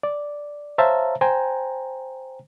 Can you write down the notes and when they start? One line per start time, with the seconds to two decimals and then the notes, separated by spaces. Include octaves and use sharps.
0.03 D5
0.78 C5 C#5 E5 F5 A5 A#5
1.21 C5 G5 G#5 A#5